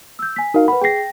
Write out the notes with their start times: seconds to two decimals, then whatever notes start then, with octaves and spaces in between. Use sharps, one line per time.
0.19 E6 G6
0.36 G#5 B6
0.54 D#4 F#4 A#4 F5
0.68 B4 F#5 B5
0.81 G#4 G5 A#6 C7